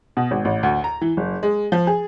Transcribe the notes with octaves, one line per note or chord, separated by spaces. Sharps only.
B2
G#1
A1
D2
A#5
E3
F#1
G#3
F3
G#4